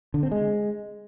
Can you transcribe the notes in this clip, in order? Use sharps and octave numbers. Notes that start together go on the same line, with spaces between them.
D3
C4
G#3